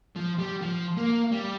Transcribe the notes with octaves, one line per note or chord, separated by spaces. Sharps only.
F3
G3
F3
A#3
G3